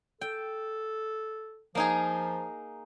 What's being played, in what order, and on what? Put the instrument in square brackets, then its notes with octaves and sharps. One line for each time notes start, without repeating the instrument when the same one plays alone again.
[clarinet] A4 [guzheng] G5
[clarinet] F3 [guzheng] A#3 D#4 G#4